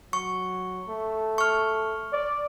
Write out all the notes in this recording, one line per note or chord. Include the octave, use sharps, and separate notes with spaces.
F#3 C#6
A3
C#6 F6
D5